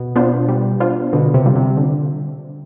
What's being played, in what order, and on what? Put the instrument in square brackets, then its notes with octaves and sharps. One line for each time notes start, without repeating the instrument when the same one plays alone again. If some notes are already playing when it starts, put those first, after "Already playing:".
Already playing: [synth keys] B2
[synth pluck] B3 D4 F4 C5
G3
B3 D4 F4 C5
[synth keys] B2 [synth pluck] D3
[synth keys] C3
[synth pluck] G3 C4 F4
[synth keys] C3
[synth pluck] D3